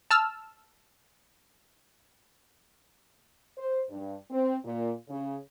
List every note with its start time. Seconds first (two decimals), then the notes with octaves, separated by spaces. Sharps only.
0.11 A5 E6 F6
3.58 C5
3.90 G2
4.31 C4
4.65 A#2
5.09 C#3